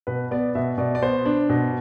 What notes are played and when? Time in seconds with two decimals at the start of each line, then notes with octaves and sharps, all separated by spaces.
0.07 B2 B4
0.31 B3 D5
0.55 B2 E5
0.78 B2 D5
0.95 D5
1.02 B3 C5
1.25 D4
1.49 B2